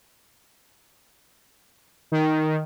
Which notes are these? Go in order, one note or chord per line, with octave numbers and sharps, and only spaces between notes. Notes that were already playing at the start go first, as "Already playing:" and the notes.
D#3